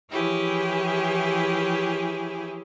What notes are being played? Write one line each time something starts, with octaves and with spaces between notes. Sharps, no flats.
E3 F3 E4 G4 G#4 C#5